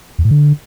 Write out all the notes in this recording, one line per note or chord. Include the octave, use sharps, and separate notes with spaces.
E2
A2
D3